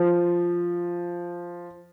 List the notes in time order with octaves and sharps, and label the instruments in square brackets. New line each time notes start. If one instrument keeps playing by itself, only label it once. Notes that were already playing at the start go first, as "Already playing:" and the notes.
Already playing: [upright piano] F3